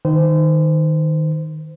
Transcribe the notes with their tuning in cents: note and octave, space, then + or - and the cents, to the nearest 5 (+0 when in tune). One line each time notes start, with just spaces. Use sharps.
D#3 +0 C5 -30